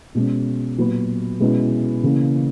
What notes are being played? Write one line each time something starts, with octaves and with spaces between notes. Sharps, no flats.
B2 G#3 C#4
A#2 F#3 B3 F#4 B4
B2 G#3 C#4 E4 B4
C#3 E3 A#3 C#4